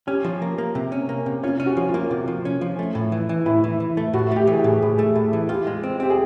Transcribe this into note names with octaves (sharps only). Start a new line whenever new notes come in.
C#4 G4
F3
A#3
A#3
C3
C#4
A#3
C3
C#4 F4
C#4
F#4
F3
F4
A#3
C3 F4
F3
C#4
F3
A3
A2
E3
E3
A2 E4
E3
E3
A3
A2 F#4
A3 G4
E3
G#4
G4
A2
A2 G#4
A3
A2
E3
F4 G4
G#3
C4
C4 G4
G#4